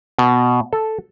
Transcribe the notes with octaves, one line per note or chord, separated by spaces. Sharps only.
B2
A4